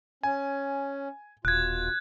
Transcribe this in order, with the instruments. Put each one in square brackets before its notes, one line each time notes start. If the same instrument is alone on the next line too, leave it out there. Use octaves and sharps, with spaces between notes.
[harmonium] C#4 [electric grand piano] G#5
[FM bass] D#1 [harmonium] B2 F4 [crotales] F#6 G#6